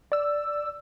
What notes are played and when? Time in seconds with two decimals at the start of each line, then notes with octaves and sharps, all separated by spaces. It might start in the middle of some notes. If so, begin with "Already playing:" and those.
0.12 D5 E6